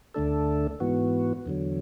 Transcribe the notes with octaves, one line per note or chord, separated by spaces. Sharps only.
D2 D3 A3 D4 A4
G#2 E3 B3 F#4
E2 D3 F#3